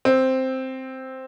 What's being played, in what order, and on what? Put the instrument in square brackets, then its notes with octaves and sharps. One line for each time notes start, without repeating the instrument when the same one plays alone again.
[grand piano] C4